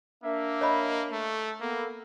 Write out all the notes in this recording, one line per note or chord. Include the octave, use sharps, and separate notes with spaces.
A#3 D4 A#4 E5
C#5 D#5 B5
A3
A#3 B3 A4